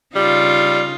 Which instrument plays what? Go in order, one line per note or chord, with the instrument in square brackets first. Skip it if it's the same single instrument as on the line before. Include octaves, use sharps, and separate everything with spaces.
[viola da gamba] C#3 D#4 F4 [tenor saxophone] G3